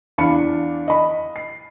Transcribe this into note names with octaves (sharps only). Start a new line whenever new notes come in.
E2 D4 F5 B5 C#7
D#5 B5
C7